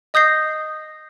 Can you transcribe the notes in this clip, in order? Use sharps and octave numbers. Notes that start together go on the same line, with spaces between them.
D#5 D#6 G6 A#6 C7